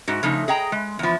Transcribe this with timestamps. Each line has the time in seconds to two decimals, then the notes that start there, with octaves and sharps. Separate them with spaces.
0.08 G#2 F#4
0.23 C#3 F3 A3 D#4
0.48 G#4 D#5 G5 A#5
0.72 G#3
0.99 E2 F3